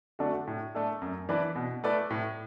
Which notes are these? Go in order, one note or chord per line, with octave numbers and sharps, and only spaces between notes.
D3 A3 D4 F#4
A2
A3 D4 A4
F#2
E3 D4 B4 D5
B2
A3 E4 B4 D5
A2